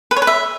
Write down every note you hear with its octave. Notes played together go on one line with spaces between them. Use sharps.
B4
C#5
B4
E5